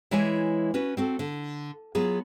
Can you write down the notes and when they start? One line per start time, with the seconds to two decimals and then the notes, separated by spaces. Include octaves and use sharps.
0.11 E3 G#3 E4 C#5 G#5
0.74 C#4 F#4 B4
0.97 C4 F#4 A4
1.19 D3
1.95 F#3 B3 F4 G#4